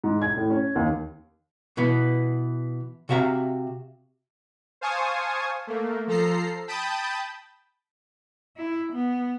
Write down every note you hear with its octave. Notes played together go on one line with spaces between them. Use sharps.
G#2
G#6
A2
C#4
D#2
B2 E3 B3
C3 F#4 E5 F5 A#5
C5 F5 G#5 A5 C#6 D#6
A3 A#3
F3 A4 A#5 C7
G5 A5 B5 D#6 G6 A6
E4
B3